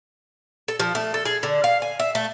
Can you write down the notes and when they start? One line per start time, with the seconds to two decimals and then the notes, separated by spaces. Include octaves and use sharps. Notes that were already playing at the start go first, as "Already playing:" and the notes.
0.68 A4
0.80 F3
0.95 A3
1.14 A4
1.25 G#4
1.43 D3
1.64 F5
1.82 G#5
2.00 E5
2.15 A3